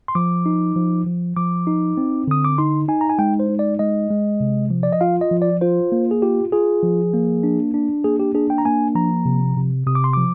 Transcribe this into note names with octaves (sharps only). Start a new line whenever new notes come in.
C6
F3 D6
D#4
F3
F3
F3 D6
D#4
C4
D3 D#6
D6
D#4 C6
D#4 G#5
A#5
G#5
G#3 G5
C5
D#4
D5
G#3 D#5
G#3
C3
F3
D5
D#5
F4 F5
D#5
F3
D5
F4 C5
A#3
G#4
F4 G4
F4 G#4
F3
A#3
D4
D4
A#3 G#4
G4
D4 G#4
G5
A#5
A#3 G#5
F3 A#5
C3
C3
C3 D#6
D6
C6
F3 D6